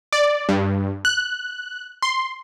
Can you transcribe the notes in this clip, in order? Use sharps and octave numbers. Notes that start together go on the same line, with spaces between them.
D5
G2
F#6
C6